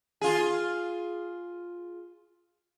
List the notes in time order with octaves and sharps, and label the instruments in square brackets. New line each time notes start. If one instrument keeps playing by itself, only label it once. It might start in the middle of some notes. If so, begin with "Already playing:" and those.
[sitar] F4 G#4